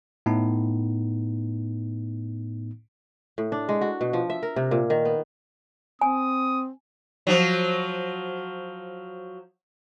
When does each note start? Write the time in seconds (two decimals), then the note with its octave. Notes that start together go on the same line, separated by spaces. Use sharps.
0.26 A2 B3 D#4
3.38 A2
3.52 D4
3.69 G#3
3.81 F#4
4.01 B2
4.13 F3
4.30 E5
4.43 A#4
4.56 C3
4.71 A#2
4.90 D#3
5.05 B3
6.01 C4 G#5 D#6
7.27 F3 F#3